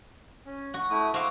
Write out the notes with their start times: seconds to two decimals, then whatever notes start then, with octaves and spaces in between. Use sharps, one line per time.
0.46 C#4
0.74 F#4
0.90 A3 E4 D#6
1.14 F#4 C5 F5 D6 E6